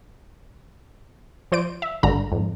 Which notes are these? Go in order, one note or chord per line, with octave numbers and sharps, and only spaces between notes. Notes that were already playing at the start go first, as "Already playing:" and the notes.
F3 C5 D5 D7
E5
G#1 G2 D3 G#3 A#5
F2 G#2